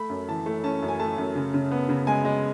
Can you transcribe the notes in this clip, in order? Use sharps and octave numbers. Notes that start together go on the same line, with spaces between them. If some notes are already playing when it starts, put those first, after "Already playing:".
Already playing: A3 B5
F#2
E3 A5
A3
C#4 A5
F#2
G#5
A3 A5
F#2
C#3
C#3
B3
C#3
G#3 G#5
G#3